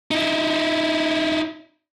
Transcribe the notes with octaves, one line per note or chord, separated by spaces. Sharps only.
D#4 E4